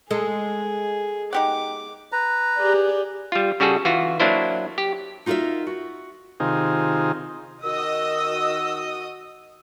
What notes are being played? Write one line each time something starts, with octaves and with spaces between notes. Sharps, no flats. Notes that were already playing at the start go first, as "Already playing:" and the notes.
G#3 G#4 A4
D#4 G4 F#5 D6
B4 A#5
G4 G#4 D5
G3 F4
C#3 G3 F#4 G#4 A4
E3 F4 F#4
F#3 A#3 D4 E4 C5
G4
D#4 F4 F#4 A#4 D#5 E5
F#4
C3 D#3 D#4 F4 G#4
D#3 F#4 D#5 D#6 E6